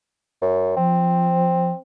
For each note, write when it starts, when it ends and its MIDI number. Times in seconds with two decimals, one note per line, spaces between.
0.42 0.73 42
0.77 1.71 53
0.77 1.78 60